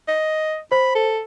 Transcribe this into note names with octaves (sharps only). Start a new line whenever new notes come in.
D#5
C5 B5
A4